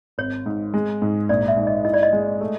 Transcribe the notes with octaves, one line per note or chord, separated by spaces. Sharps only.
G#1 C#5
G#2
G#3
G#2
A#1 D5
E5
G#2
D#5
E4 D#5
D5
D#5
G#3
A3